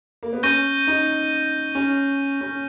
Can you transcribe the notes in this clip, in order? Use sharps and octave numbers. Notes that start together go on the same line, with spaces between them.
A#3
B3
C#4 C#6 G6 A#6 D#7 G7
D#4
C#4
C#4